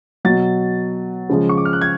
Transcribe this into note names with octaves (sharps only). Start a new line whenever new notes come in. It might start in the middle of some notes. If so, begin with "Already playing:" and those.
B2 F#3 A6
C#3 F3 G#3
C#6
D6
F6
F#6
G#6